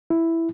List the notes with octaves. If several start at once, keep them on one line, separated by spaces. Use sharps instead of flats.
E4